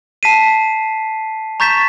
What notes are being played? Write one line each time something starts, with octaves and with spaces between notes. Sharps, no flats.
A5 B6 C7 D#7
A#5 C#6 G6 A6 B6 E7